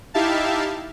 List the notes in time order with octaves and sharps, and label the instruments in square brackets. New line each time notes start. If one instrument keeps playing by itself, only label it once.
[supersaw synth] D#4 E4 G4 E5 F5 A5